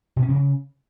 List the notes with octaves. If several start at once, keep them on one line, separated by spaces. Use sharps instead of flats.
B2
C#4
C3
C#3